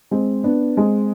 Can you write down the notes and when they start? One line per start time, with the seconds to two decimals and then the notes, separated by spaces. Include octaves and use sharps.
0.11 G#3 C4
0.44 B3 D4
0.77 G#3 C4